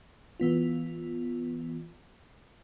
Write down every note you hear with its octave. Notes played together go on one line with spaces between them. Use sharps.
E3 B3 F4